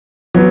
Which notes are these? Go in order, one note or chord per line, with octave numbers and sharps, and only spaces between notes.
F#3 B3